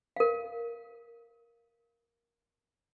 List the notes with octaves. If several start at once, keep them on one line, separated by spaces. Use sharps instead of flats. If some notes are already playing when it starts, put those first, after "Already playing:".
A#4 F5